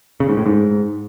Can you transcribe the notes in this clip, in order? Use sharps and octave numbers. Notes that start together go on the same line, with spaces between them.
C#3
G#2
A2
G#2